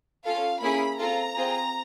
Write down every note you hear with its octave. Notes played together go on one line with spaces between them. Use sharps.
C#4 F4 A4 F5
A#3 C#4 E4 G#4 B5
C4 F4 A4 A#5
C4 F4 G#4